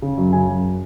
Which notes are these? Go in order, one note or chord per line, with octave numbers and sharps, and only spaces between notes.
C#3
F#2
C#3 G#5
F#2